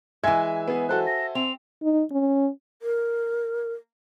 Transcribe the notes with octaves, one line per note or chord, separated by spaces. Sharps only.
E3 G#3 E5 G#5 G#6
B3 G#4
F#4 A4 C5 F#6
A#6
C4 F7
D#4
C#4
A#4